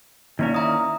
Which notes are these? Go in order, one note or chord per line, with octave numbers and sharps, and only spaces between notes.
D#3 A#3 C#4 E4 D5 F5
E5 A#5 D#6